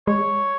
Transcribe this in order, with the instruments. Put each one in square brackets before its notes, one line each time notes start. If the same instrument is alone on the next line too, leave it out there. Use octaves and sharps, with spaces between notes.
[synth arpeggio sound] G#3 [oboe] C#5